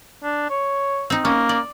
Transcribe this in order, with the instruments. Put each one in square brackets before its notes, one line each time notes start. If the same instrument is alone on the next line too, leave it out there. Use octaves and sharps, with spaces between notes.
[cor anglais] D4
C#5
[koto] C4 D#4
[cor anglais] A#3 [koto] C#4
[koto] D5